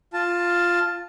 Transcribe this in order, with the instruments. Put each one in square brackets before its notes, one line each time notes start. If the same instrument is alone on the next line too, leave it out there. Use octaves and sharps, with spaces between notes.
[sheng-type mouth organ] F4 A5